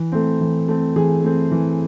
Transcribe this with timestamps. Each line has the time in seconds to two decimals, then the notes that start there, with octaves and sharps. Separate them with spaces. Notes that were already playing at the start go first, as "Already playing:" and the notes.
Already playing: E3
0.12 A3 C4
0.40 E3
0.68 A3 C4
0.96 E3 G#4
1.24 A3 C4
1.52 E3